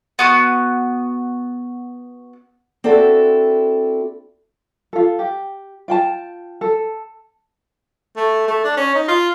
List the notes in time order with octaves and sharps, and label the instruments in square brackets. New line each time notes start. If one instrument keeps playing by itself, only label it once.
[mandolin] B3 F#4 D#6
[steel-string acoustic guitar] C4 D4 E4 F#4 A4
[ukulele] F4 A4
G4
F4 G5 A5
A4
[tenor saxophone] A3
A3
D4
C#4
D#4
F4